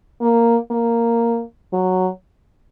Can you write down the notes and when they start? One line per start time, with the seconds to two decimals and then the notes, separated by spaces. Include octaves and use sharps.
0.21 A#3
0.71 A#3
1.73 F#3